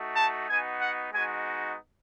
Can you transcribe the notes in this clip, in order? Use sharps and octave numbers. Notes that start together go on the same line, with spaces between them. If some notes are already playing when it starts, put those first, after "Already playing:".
Already playing: A3 D#4 F#4
A5
B3 D#4 F#4 G#5
F#5
G#3 B3 D#4 F#4 G#5